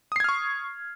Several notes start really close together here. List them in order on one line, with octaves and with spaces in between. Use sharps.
D#6 C7 G#6 F6 C#6